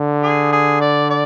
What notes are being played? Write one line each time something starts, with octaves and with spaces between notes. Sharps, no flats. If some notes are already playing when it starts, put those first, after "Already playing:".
Already playing: D3
G#4
G#4
D5
D5